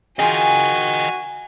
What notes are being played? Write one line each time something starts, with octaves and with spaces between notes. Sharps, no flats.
F4 F#4 G#4 D#5 G5 G#5